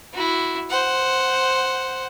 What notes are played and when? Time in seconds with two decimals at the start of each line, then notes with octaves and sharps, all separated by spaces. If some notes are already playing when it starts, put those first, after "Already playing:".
0.13 E4 F#4
0.70 C5 F#5